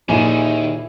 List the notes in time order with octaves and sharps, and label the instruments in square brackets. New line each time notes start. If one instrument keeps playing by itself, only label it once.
[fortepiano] A#1 F4 [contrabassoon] D#2 [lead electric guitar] D#3 [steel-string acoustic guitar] E4 G#4